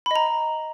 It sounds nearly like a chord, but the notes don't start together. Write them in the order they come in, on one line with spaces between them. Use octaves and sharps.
B5 D#5 A#5